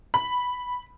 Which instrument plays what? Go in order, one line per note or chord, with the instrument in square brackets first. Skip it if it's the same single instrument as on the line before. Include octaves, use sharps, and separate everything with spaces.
[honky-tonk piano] B5